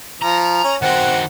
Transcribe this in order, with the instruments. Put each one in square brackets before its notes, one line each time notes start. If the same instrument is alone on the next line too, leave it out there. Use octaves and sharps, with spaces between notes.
[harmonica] F3 [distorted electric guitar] A#5
[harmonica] C#4
[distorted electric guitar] D#3 F#4 [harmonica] C4 F#5